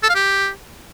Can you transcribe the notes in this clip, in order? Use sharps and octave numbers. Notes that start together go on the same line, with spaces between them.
A4
F5
G4